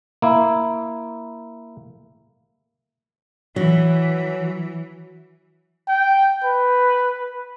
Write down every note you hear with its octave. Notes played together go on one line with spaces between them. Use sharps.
A#3 E4
E3 F#3
G5
B4